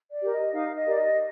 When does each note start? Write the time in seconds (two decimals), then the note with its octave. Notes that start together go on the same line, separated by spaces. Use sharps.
0.11 D5
0.21 G4 A#4
0.32 D#5
0.53 D#4 F5
0.75 D#5
0.86 G4 A#4 D5
0.95 D#5